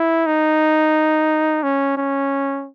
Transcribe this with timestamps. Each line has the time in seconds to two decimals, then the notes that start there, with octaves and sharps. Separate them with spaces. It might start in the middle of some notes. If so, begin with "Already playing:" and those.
Already playing: E4
0.27 D#4
1.63 C#4
1.97 C#4